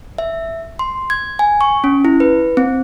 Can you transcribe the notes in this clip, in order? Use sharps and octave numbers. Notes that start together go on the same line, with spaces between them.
E5
C6
G#6
G#5
C#6
C#4
E4
B4
C4